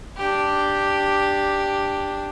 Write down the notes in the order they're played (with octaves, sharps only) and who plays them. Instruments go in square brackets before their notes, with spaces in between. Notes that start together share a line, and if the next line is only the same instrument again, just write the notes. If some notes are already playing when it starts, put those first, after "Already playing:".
[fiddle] D4 G4